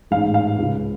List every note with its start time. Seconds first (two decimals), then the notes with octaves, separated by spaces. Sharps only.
0.11 A1 G#2 F5
0.34 F5
0.58 C#2 C#3